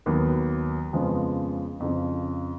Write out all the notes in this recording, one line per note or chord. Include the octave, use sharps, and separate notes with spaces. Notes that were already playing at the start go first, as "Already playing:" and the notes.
D#2 D#3 F#3 B3
F2 C#3 F3 G#3 B3
F2 C#3 F3